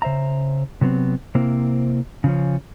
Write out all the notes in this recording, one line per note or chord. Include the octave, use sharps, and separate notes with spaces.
C#3 C5 E5 A#5
C3 F#3 B3 C4
C3 A#3 C4 E4
C#3 F3 C#4